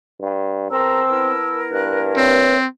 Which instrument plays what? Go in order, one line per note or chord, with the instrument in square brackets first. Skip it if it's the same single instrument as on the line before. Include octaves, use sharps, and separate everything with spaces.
[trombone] G2
[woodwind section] E2 A#4 A#5 [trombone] C4 [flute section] A5 E6
[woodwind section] B3 E4 A#4
[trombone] G2 [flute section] F#6
[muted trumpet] C4 [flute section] B4 C#5 E5